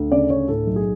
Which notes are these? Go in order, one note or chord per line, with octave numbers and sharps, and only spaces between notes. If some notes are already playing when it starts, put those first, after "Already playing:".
Already playing: D2
C#3 D5
D2 C#5
A2 A4
B1
G#4